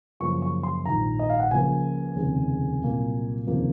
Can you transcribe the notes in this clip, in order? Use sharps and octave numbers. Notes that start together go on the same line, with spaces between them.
F#2 C#3 F3 A#3 C#6
C#6
C6
A#1 G#2 D#3 A#5
D#5
F5
F#5
C#2 C#3 F3 A#3 G#5
F1 D#2 C#3 G#3
C2 A#2 F#3 A#3
F1 D#2 C#3 F3 A#3